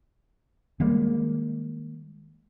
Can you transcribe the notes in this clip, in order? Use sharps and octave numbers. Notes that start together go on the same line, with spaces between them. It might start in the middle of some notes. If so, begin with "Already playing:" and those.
D#3 G3 G#3 A#3